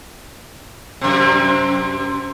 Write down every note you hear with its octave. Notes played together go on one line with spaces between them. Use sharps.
F#2 C3